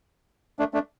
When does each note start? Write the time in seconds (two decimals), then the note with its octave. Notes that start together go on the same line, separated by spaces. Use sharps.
0.59 A3 D4
0.74 A3 D4